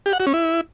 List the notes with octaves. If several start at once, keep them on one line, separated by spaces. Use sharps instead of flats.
G4
F#5
F#4
C#4
E4